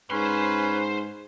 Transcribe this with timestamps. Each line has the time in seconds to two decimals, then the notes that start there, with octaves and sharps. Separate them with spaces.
0.11 G#2 C#4 B4 C5 C6